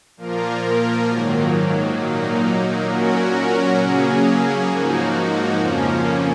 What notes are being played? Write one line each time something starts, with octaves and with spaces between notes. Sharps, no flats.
A#2 F3 A#3 F4 A#4
G#2 D#3 F#3 A#3
A#2 F#3 A#3 D#4
A#2 F#3 C#4 F#4 A#4
C#3 F#3 A#3 C#4 G#4
G#2 F3 A#3 D#4 F#4
F2 C#3 F3 A#3 C#4